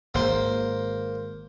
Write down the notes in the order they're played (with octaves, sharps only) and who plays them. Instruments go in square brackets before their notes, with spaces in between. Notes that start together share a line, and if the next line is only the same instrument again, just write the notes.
[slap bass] G#1 [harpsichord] A#3 C5